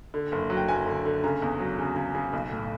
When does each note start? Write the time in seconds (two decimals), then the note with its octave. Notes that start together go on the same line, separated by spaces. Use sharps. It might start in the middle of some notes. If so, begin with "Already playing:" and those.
0.14 D3
0.32 F#1
0.50 F#3
0.57 G5
0.68 F#1 G#5
0.86 D3
1.05 D3
1.24 C#3 A#5
1.42 E2
1.59 F#3
1.79 C#3
1.96 C#3
2.15 C#3
2.33 B1
2.51 A2